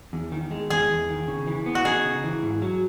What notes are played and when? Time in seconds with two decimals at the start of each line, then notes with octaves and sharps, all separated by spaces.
0.13 E2
0.32 D#3
0.51 G#3
0.70 E2 G#4
0.89 E2
1.09 D#3
1.28 C#3
1.47 E3
1.66 B3
1.75 F#4
1.85 D#4 G#4
2.05 C#3
2.24 E3
2.43 G#2
2.62 F#3